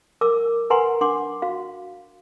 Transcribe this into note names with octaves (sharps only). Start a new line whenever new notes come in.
A#4 D6 E6
A#4 B4 F#5 G#5 A#5 C6
D4 F#5 C6 D6
F#4 F5